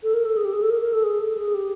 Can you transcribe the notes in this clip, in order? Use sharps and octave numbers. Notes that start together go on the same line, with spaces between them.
A4
A#4
A4
G#4
G4
G#4
A4
A#4
A#4
A4
G#4
A4
G#4
G4